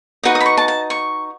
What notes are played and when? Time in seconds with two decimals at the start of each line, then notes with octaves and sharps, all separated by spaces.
0.23 D#4 F#4 B4 D#5
0.35 D#6
0.40 B5
0.46 C#6
0.57 A5
0.68 A5
0.90 C#6